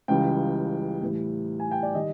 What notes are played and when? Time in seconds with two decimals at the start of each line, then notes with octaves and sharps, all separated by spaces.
0.08 C#2 C#3 E3 G3 G5
1.02 A2 E3 G3
1.60 G#5
1.71 G5
1.83 D5
1.95 D#3 G3 D#5